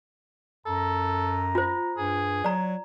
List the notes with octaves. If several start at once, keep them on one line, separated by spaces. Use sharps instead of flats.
F#2 A4 A#5
F4 C5
G2 G#4
F#3 D5 A#5